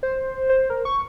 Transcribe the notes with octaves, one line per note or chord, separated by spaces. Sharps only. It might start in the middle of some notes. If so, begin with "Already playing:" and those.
C5
C5
A#4
C#6